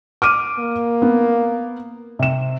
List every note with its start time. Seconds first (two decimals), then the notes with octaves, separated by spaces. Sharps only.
0.22 D6 F6 D#7
0.59 A#3
1.02 B3
2.19 C3 E7